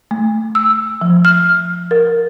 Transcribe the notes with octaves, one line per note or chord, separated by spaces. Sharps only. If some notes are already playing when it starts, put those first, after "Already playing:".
A3
E6
F3
F6
A#4